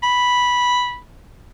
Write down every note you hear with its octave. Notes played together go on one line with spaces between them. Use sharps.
B5